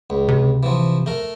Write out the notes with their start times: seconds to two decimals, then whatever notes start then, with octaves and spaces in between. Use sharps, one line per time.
0.10 C#2
0.28 C3
0.63 E3 F3
1.06 A3 A#4